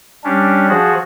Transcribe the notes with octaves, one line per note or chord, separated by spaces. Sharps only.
G3 C#4 D4
F3 F#4 G#4